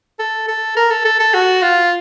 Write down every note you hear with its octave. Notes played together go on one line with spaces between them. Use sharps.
A4
A4
A#4
A4
A4
A4
F#4
F4